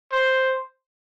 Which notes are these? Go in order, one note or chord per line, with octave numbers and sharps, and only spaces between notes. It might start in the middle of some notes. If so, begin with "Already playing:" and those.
C5